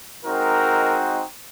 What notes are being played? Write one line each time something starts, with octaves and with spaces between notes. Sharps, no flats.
G#3 C4 D#4 F#4 A#4